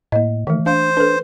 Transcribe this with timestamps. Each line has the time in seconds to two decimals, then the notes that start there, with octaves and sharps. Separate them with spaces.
0.12 A2 A#3 D#5
0.47 D#3 E3 A3
0.66 D4 C5 F5
0.97 D4 A4 B4